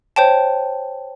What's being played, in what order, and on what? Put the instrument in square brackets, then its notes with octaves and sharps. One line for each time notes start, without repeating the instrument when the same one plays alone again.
[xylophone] C5 C#5 G5 A5